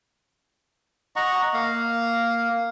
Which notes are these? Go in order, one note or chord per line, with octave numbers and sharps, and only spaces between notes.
D#5 F#5 A#5 C#6
A#3 F5